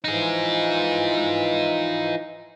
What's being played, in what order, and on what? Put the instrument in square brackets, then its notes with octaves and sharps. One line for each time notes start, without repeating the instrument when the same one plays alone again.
[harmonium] E3 F3 [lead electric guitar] D#4 G#4